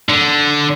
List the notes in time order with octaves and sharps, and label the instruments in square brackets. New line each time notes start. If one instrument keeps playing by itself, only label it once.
[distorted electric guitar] D3